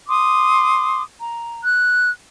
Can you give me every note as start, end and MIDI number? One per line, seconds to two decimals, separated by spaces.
0.09 1.03 84
0.09 1.03 86
0.09 1.03 87
1.19 1.60 82
1.63 2.10 90